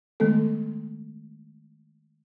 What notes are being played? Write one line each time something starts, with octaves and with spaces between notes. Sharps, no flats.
D#3 G#3 A3 B3 A4